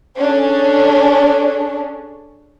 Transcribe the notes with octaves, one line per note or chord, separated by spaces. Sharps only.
C#4 D4 G#4 A4 C#5